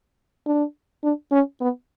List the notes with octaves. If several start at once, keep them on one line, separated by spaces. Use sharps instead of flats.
D4
D4
C#4
B3